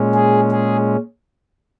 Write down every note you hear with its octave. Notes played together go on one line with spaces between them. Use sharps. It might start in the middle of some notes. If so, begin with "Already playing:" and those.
Already playing: A#2 G#3 C#4
G#4
G#4